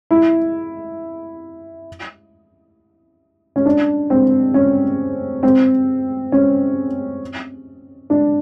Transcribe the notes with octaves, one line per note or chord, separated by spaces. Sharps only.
E4
C#4
D4
C4
C#4
C4
C#4
D4